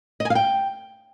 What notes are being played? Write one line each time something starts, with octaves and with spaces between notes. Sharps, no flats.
D#5
G#5
F5
G5